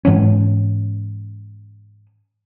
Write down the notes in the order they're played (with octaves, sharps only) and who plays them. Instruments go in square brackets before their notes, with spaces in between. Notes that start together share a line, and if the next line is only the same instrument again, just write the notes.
[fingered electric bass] G#2 E3 B3 C#4